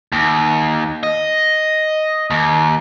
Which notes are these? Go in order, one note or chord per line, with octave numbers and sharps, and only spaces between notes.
D#2
D#5
D#2